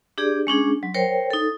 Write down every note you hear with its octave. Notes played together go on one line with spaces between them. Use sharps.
D4 G4 G#4 D5
G#3 C#4 D4 G#4
F#3
A#4 C5 C#5 G5
D#4 A4